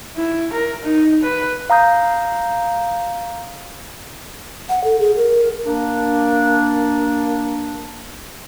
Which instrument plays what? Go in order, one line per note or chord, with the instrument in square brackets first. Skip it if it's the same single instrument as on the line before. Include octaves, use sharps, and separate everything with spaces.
[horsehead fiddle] E4
A#4
D#4
B4
[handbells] F5 A#5 D#6 G6
[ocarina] F#5
A4
G#4
A#4
[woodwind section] A#3 D4